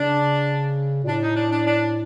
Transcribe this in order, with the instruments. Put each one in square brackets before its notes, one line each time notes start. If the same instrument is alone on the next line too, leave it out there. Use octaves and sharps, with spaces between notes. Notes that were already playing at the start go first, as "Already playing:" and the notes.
Already playing: [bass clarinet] C#3 [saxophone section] D4
[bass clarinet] A#2
[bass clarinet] A2 [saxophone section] D4
[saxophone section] D#4
D4
D4
D4